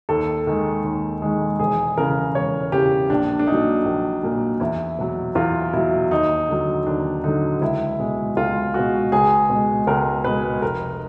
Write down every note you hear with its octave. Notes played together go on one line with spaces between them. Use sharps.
D#2 A4
D#3 G#3
D#2
D#3 G#3
E1 G#4
E2 C#3 A#4
E1 C#5
E2 C#3 G4
A#1 D4
D4
A#2 F#3 D#4
A#1
A#2 F#3
E2 E4
B2 F#3
E2 F4
B2 F#3 E4
D#2 D#4
D3 F#3
D#2 D4
D3 F#3 D#4
C#2 E4
B2 G#3
C#2 F4
B2 G#3 F#4
C#2 G#4
B2 G#3
C#2 A#4
B2 G#3 B4
F1 A#4